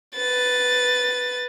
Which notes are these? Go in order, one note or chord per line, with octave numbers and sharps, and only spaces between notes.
B4 A6